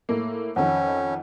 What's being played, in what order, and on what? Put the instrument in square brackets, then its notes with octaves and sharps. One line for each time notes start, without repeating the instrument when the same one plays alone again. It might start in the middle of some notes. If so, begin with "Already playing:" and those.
[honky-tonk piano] A2 A#3
[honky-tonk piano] F2 D#3 [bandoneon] C#4 [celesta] F#5